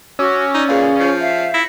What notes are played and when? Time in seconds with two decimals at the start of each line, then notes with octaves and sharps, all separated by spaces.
0.19 C#4 F#4 D6 E6
0.54 D#4 D5
0.69 A#2 G#4 B4 F5
1.00 F3 C7
1.20 E5 F5
1.54 E4 A#6 C#7